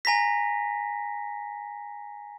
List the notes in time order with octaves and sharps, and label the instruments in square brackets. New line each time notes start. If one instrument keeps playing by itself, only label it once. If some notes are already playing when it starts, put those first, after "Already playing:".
[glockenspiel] G#5 A#5 A#6 B6